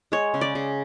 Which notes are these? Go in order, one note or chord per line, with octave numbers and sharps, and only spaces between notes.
G#3 C#5
C#3
D5
C#3